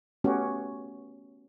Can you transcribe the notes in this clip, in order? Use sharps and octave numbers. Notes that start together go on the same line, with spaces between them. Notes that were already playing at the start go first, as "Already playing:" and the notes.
A3 B3 C#4 F#4 G4